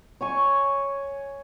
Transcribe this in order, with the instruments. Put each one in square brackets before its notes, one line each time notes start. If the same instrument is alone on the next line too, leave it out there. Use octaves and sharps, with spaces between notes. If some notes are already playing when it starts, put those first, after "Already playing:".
[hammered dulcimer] C#5 G#5 C#6